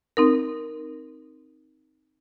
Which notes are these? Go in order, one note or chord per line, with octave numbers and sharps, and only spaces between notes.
C4 D#4 A#4